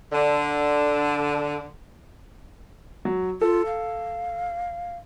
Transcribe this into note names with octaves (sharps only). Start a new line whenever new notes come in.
D3 D4
F#3
F4 A4
F5